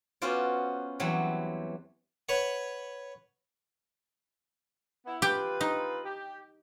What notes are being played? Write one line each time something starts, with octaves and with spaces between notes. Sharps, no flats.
B3 C#4 F4 F#4 C5 D5
E2 E3 F#3 G3 C4 B5
B4 C#5 F#5
B3 E4
C4 F4 G4 B4 G5
D#4
G4